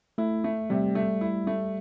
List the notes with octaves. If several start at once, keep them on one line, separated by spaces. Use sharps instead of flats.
A3 E4
A3
C3 G3
A3
E4
A3